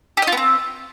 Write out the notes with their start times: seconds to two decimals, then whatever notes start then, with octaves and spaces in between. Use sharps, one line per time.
0.17 G4
0.22 D#5
0.27 F4
0.32 B3
0.37 C4